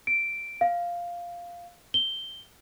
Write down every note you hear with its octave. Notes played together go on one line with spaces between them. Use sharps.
D7
F5
G7